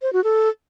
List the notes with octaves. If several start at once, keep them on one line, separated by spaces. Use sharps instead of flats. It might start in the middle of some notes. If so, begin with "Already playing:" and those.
C5
F#4
A4